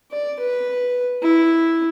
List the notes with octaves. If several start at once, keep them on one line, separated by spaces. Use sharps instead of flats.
D5
B4
E4